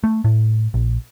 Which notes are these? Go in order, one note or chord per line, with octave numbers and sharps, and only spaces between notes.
A3
A2
A#1